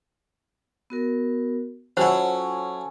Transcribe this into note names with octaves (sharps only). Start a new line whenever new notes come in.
B3 F#4 A#4
F#3 C#4 E4 F4 A4 C5 F#5 G#5